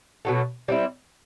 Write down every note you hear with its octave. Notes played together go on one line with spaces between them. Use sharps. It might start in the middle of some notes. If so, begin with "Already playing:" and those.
B2 F#3 A3
G3 C4 E4